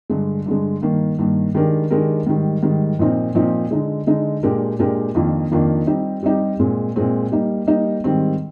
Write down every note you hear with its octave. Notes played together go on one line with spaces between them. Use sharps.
G2 D3 G#3
G2 D3 G#3
G2 D#3 A#3
G2 D#3 A#3
D#3 G#3 D4 G4 A#4
D#3 G#3 D4 G4 A#4
G#2 D#3 G3
G#2 D#3 G3
A#2 F3 C4 D#4
A#2 F3 C4 D#4
D3 G#3 D#4
D3 G#3 D#4
A#2 G#3 D4 G4 A#4
A#2 G#3 D4 G4 A#4
F2 D#3 A#3 D4 F4
F2 D#3 A#3 D4 F4
G3 C4 D#4 G4
G3 C4 D#4 G4
A#2 G#3 C4
A#2 G#3 C4
G3 A#3 D#4
G3 A#3 D#4
G#2 D#3 G3 C4